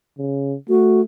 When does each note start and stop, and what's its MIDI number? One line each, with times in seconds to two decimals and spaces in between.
0.19 0.55 49
0.69 1.02 57
0.69 1.01 66